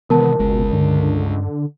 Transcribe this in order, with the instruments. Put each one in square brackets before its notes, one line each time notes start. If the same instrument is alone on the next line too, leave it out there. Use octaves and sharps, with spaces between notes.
[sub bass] C3 [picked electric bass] D#3 E3 G#3 [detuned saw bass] B3 [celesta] A#4 A5
[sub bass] G1 [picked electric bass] C#2 G#3 [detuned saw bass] B2
[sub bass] G2 [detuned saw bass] D3